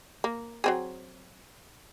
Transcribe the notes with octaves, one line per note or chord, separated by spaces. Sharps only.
A#3
F#3 C4 G#4